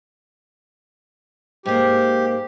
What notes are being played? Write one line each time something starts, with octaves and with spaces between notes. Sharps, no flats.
G#2 A#3 G4